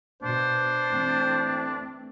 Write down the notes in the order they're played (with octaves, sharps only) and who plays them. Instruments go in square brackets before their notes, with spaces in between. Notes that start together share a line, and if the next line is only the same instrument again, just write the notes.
[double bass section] B2 [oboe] D4 [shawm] C5
[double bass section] E3 A3 C4